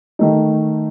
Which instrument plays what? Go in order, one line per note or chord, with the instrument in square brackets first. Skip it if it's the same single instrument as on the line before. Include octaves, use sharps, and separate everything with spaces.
[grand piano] D#3 A3 D#4